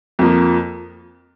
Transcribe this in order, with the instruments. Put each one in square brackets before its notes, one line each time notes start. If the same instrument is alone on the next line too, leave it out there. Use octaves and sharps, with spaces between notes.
[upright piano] F2 F3 A#3